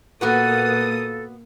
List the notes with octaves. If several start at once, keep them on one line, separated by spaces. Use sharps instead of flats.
A#2 A#3 B3 F#4 A4 B4 D#6